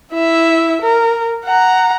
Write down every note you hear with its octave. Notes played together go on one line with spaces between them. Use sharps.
E4 E5
A#4
F#5 A#5